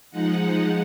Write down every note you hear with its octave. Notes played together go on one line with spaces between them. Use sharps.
F3 G#3 D#4 F#5